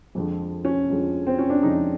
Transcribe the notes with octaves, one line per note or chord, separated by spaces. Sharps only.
F2 D3 F3 G#3
C#4
F2 D3 F3 G#3
C4
C#4
D4
F2 D3 F3 G#3 D#4